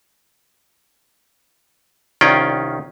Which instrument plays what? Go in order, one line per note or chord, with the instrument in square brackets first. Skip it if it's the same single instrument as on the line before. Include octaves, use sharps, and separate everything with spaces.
[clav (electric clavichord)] C2 D#3 C#4 F4 D5 G5